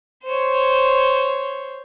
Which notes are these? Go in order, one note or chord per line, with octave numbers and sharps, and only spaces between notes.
C5 C#5